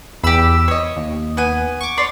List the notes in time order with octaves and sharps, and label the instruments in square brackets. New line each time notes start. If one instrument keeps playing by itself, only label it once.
[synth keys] E2 E6 [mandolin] G4 B5
[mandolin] C#5 D#5
[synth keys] D#2
[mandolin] B3 G#5
[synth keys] C#6 D6
[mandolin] C#5 D5 C6